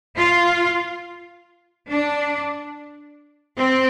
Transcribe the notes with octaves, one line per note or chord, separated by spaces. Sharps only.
F4
D4
C4